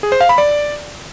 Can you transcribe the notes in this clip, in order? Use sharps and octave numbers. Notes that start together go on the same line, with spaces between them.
G#4
C5
F5
B5
D5